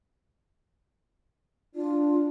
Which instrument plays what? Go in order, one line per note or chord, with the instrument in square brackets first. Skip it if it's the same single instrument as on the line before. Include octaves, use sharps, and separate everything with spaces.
[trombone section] D4 [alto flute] F4